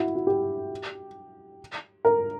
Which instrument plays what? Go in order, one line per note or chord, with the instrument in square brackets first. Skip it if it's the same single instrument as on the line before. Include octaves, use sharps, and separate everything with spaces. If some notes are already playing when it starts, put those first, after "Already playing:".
Already playing: [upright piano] E4 F#4
F#4
G4
A#4